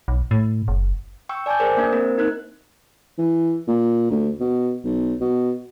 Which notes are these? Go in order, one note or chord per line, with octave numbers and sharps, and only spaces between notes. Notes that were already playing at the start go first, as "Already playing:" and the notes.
B1
A2
F#1
G5 C#6 E6
D5 G#5 A5 D6 G6
G#4 A#4 C5 D5
A#3 D4 C5
A#3 C4 A#4
D#4 A#4 F#6
E3
A#2
D2
B2
B1
B2